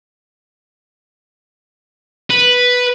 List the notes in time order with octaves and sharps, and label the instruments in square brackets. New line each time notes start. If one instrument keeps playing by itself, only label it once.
[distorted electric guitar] B4